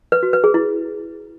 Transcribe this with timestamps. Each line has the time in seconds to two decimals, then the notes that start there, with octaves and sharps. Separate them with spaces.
0.12 B4
0.23 F#4
0.33 B4
0.44 G#4
0.54 E4